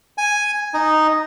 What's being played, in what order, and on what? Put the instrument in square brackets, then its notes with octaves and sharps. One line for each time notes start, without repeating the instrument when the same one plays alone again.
[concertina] G#5
D#4